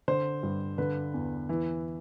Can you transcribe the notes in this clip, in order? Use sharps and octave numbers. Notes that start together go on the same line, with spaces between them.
D3 C5
G2
D3 B4
E2
E3